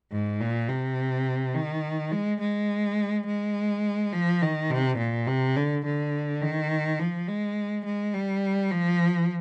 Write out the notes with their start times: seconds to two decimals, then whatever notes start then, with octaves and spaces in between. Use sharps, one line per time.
0.12 G#2
0.40 A#2
0.69 C3
1.54 D#3
2.12 G#3
2.41 G#3
3.26 G#3
4.13 F3
4.42 D#3
4.70 C3
4.98 A#2
5.27 C3
5.56 D3
5.85 D3
6.42 D#3
6.99 F3
7.28 G#3
7.85 G#3
8.14 G3
8.71 F3